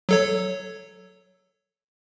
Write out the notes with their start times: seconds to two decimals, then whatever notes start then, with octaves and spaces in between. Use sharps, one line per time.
0.09 F#3 A4 C#5